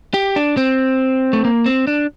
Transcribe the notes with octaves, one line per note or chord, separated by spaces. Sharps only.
G4
D4
C4
A3
A#3
C4
D4